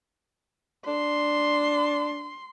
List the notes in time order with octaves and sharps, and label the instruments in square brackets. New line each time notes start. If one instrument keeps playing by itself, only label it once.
[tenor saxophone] D4 [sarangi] C6